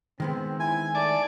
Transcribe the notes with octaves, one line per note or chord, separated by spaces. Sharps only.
D#3 G#3 B3 C4
E4 G#5
A3 D5 G#5 A5 D6